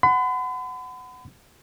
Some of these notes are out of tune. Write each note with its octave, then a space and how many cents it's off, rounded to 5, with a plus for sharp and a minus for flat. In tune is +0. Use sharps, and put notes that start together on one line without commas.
F#5 +0 B5 +45